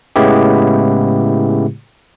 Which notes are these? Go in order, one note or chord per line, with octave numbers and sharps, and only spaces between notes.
A2 C#3 G#3 B3 E4 G4